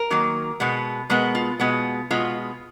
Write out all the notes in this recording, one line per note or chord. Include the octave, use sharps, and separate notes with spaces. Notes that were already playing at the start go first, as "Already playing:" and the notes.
Already playing: A#4
D#3 F#3 A#3
B2 G#3 B3
B2 G#3 B3 A#4
F4
B2 G#3 B3
B2 G#3 B3 F4